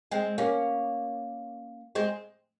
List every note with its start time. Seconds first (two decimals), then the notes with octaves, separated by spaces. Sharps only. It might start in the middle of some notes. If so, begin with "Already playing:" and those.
0.11 G#3 C4
0.38 A#3 C#4
1.95 G#3 C4